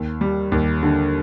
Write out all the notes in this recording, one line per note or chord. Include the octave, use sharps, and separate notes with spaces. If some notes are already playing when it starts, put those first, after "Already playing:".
Already playing: D#2
G3
D#2
D3